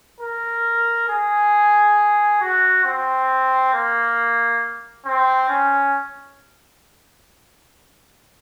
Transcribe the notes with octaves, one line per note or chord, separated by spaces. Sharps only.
A#4
G#4
F#4
C4
A#3
C4
C#4